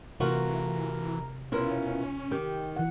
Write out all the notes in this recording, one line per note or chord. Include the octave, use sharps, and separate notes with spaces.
C3 E3 A3 F4 F#4 A#4
B2 C#4 E4 F4 A#4
D#3 G4
E3 F#5